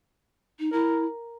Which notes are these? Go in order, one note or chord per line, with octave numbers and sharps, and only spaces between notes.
D#4
E4 A#4